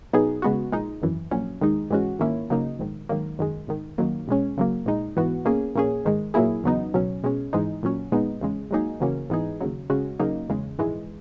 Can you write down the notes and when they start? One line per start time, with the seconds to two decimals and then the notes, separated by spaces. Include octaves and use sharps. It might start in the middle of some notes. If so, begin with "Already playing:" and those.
0.13 B2 F#3 B3 D#4 G#4
0.42 C#3 G#3 B3 F#4
0.72 A#1 A#2 G#3 D#4
1.02 G#1 F#2 E3
1.31 A#1 A#2 F#3 C#4
1.61 D#2 D#3 G#3 D#4
1.90 G#2 E3 G#3 C#4 F#4
2.19 G#2 D#3 A#3 C#4 E4
2.50 C#3 F#3 A#3 D#4
2.79 A#1 G#2 D#3
3.09 G#2 D#3 F#3 A#3
3.39 F#2 D#3 G#3
3.67 G#1 G#2 D#3
3.98 F#2 D#3 F#3 A#3
4.27 B1 B2 G#3 C#4
4.57 F#2 C#3 F#3 A#3
4.86 A#1 A#2 G#3 D#4
5.16 G#2 E3 B3 F#4
5.45 B2 A#3 C#4 G#4
5.75 A#1 A#2 A#3 C#4 G#4
6.05 G#2 D#3 G#3
6.34 A#2 F#3 A#3 E4 G#4
6.63 E2 C#3 F#3 B3 D#4
6.94 C#2 B2 F#3 C#4
7.24 B2 G#3 C#4
7.53 G#1 G#2 E3 G#3 D#4
7.83 A#2 F#3 C#4
8.12 A#1 A#2 G#3 B3 D#4
8.41 E2 C#3 G#3
8.71 G#2 F#3 A#3 D#4 G#4
9.00 E2 C#3 F#3 A#3 C#4
9.30 G#2 E3 B3 D#4 G#4
9.61 D#2 C#3 F#3
9.90 C#3 G#3 C#4 F#4
10.19 C#3 F#3 A#3 D#4
10.49 E2 C#3 G#3
10.79 A#1 G#2 E3 G#3